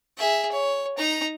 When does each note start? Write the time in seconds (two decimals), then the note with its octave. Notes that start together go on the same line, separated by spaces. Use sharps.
0.18 G#4 E5
0.52 C#5
0.98 D#4 A#5